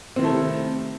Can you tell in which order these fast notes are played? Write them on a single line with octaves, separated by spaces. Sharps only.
C4 D#3 E4 A3 C3